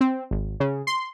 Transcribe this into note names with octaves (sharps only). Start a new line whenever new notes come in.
C4
G#1
C#3
C6